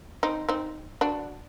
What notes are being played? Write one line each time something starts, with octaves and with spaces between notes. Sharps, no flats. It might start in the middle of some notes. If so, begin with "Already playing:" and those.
C4 D#4
C4 D#4
D4 F#4